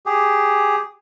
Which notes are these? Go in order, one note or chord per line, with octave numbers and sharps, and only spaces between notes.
G4 G#4